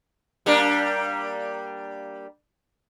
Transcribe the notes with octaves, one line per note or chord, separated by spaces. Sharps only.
G3 A#3 D4